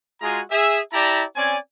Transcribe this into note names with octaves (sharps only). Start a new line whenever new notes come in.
G#3 F4 F#4 G#4 G#5 A#5
G#4 E5
E4 G4 D5 A5 A#5
C4 C#4 D5 G#5